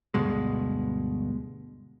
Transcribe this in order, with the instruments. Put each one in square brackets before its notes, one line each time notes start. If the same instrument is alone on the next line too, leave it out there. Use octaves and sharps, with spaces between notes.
[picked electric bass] D2 G2 B2 G#3